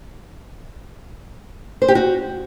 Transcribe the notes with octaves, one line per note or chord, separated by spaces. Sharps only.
C5
G4
F#4